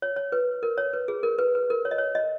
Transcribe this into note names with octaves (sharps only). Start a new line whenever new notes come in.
C#5
C#5
B4
A#4
C#5
B4
G#4
A#4
B4
B4
A#4
C#5
D#5
C#5
D#5